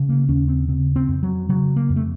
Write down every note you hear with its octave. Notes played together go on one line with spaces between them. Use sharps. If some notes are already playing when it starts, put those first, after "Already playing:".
Already playing: C#3
A#3
D#2 C#4
C4
C#3 C4
C4
F2
F#3
C#3 F#3
A#3
F2
A3